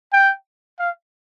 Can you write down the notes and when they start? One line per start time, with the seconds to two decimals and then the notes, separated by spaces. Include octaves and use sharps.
0.13 G5
0.79 F5